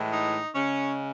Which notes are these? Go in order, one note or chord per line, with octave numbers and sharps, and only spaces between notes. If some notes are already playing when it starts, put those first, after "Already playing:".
Already playing: A2 E3 G#3
D#4
C#3 G#3 C#4